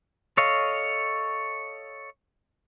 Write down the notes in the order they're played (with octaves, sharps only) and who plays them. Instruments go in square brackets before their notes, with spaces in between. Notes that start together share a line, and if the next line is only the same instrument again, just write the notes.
[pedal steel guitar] A4 C#5 D#5 F5